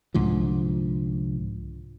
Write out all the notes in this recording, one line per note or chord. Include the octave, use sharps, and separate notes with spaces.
C2 G#2 D3 F3